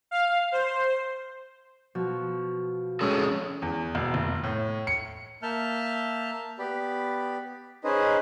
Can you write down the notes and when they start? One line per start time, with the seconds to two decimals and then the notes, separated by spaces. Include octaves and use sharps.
0.11 F5
0.52 C5
1.95 B2 F3 F#4
3.01 F2 G#3 C#4 G#4 A4
3.62 E2
3.95 E1
4.14 F1
4.44 A2
4.87 C#7
5.43 A#3 E5 A5 F6 G6
6.59 B3 G4 D5 B5
7.84 C#4 D#4 G#4 B4 C5 D#5